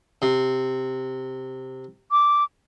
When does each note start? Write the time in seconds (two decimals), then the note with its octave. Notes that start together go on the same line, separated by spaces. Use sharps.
0.22 C3
2.11 D6